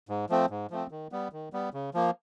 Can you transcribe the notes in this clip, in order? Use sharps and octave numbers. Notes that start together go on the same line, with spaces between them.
G#2
F3 A3 C4
G#2
F3 A3 C4
D#3
G3 B3
D#3
G3 B3
C#3
F3 A#3